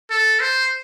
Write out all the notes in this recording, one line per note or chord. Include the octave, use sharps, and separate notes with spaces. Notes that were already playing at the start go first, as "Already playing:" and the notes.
A4
C5